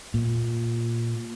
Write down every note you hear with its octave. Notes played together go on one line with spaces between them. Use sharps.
A#2